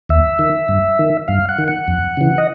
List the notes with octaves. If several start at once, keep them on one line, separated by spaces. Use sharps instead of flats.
D#2 E5
D#3
G2
D#3
G2 F5
F#5
D#3
F#5
F2
C#3 E3
D#5